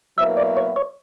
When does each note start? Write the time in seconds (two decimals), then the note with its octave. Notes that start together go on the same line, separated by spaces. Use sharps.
0.17 B2 F#3 A#3 E4 B4 E5
0.37 D5
0.57 C#5
0.76 C#5